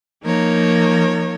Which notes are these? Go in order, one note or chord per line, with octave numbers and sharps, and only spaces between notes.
F3 A#3 D#4 A#4 C#5